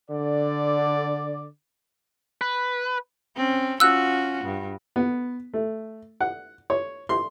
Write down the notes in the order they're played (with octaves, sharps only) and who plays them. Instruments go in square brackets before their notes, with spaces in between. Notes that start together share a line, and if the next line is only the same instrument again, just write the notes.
[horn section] D3 D5
[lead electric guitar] B4
[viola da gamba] C4 C#4
[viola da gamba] C#4 F4 F#4 [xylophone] E6 F#6
[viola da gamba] G2
[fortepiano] B3
A3
F#5
C#5
C6